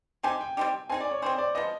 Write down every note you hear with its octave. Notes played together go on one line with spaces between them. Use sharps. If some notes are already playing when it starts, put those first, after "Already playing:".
G3 C4 D#4 G4 G#5
G5
G3 C4 D#4 G4
C4 D#4 G#4 G#5
D5
C#5
C4 D#4 G#4 C5
D5
F3 G#3 B3 D#5